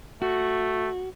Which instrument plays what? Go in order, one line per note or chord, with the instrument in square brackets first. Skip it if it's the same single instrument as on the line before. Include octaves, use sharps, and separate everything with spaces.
[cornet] A3 [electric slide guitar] F#4